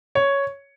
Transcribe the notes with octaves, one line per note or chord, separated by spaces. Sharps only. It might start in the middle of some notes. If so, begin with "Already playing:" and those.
C#5